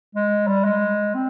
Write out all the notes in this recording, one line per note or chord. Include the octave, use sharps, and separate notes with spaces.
G#3
G3
G#3
C4